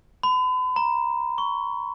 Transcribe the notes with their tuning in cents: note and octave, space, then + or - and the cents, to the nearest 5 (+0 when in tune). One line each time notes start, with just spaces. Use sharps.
B5 +40
A#5 +20
C#6 +10